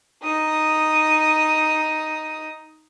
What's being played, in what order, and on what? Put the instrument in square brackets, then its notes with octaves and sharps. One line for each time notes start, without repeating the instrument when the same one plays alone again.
[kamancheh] D#4 D#6